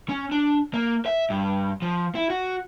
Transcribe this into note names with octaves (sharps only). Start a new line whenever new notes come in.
C#4
D4
A#3
E5
G2
F3
E4
F#4